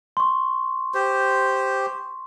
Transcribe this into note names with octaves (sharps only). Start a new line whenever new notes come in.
C6 C#6
G4 C5